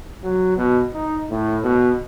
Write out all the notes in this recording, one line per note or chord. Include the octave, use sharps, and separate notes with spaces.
F#3
B2
D#4
A2
B2